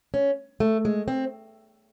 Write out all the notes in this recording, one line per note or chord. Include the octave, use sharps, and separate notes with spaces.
C#4
A3
G#3
C4